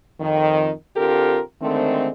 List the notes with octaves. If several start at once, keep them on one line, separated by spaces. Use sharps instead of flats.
F2 D#3
D3 C4 F4 G4 A4 A#4
D3 D#3 G#3 A3 C4